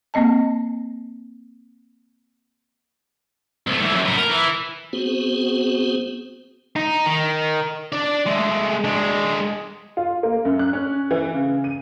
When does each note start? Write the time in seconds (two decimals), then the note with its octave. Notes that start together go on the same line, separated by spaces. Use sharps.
0.14 A#3 C4 D#5 A5
3.67 C2 A3
3.80 C2 E3
3.93 F#2
4.05 A2 B3
4.17 A#4
4.30 E3
4.93 B3 C4 F#4 G#4 C5
6.76 D#4
7.06 D#3
7.92 D4 D5
8.26 G#3 A3
8.84 G#3 D4
9.97 F4
10.23 A#3
10.45 F#2
10.59 F#6
10.73 C#4
11.11 E3
11.34 C#3
11.64 D#7